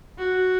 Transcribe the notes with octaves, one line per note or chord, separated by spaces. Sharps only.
F#4